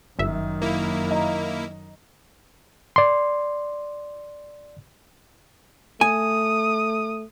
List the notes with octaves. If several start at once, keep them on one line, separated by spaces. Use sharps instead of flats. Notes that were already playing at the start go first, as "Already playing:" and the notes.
G1 F#2 D#3 E5
A#3 E4
D#5 A#5
D5 C6
A3 G#5 D#6